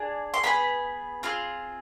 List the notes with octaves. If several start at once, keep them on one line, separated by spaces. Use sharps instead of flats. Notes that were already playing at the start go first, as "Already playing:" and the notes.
Already playing: D4 G#4
C6
B3 F4 G#4 B5
C4 F4 G#4